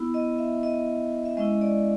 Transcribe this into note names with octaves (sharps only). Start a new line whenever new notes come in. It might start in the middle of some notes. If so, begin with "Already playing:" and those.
Already playing: B3 E4
D#5
E5
D#5
E5
G#3 C#4 E4 D#5
D5